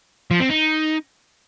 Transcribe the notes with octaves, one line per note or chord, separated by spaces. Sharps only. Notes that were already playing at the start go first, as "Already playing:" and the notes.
F3
C4
D#4